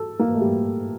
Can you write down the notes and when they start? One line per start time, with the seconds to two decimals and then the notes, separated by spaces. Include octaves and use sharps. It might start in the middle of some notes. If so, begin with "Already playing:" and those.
Already playing: A4
0.19 A#3
0.35 A3
0.41 G3